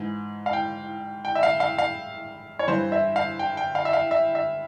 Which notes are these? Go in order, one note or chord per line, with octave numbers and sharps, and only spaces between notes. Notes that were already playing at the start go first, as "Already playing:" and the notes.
Already playing: G#2 E3
F5
G5
G5
E5
F5
F5
F5
C#5
G2 E3 C5
E5
F5
G5
G5
F5
E5
F5
E5
E5